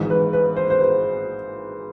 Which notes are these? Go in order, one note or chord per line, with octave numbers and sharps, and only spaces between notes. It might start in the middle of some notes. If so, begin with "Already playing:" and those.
Already playing: G#1 G#2 E3 G#3
B4
B4
C5
C5
B4